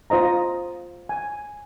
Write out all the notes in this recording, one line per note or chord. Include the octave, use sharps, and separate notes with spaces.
F4 C5 D#5 A#5
G#5